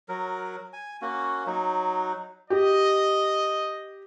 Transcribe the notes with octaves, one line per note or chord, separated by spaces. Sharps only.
F#3 A#4
G#5
A#3 C#4 F#4
F#3 D#4
G4 D#5